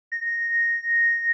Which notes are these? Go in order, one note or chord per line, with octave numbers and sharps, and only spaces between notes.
A#6